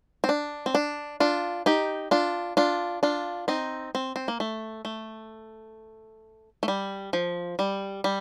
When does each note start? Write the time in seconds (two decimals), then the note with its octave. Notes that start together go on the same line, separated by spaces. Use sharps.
0.24 C4
0.29 D4
0.66 C4
0.75 D4
1.20 D4 F4
1.66 D#4 G4
2.11 D4 F4
2.57 D4 F4
3.03 D4 F4
3.48 C4 D#4
3.95 C4
4.16 C4
4.28 A#3
4.40 A3
4.85 A3
6.63 A3
6.68 G3
7.13 F3
7.59 G3
8.04 G3